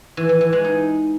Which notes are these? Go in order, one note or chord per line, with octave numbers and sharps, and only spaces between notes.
E3
E3
E3
G#3
D#4